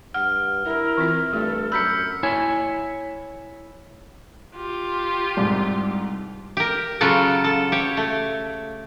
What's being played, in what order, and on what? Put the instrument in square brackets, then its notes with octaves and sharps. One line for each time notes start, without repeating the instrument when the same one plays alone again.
[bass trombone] G2 [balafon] F#5 [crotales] F6
[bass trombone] E4 [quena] A#4
[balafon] E3 C4 F4
[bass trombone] G2 [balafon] A3 [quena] A4
[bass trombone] F#2 [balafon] A#5 B5 [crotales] E6 B6 C#7 [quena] G6
[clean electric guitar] E4 C#5 G#5
[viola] F4 G4
[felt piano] C2 G#2
[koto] G4 A#4
C#3 F#3 F4 F#4 A4
A4
G4 C#5
A3